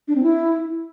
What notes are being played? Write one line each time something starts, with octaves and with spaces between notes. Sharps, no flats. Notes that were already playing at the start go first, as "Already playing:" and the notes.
D4
C4
E4